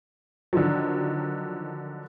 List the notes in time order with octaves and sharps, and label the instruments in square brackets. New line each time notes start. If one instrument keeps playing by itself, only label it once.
[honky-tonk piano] D3 D#3 F3 F#3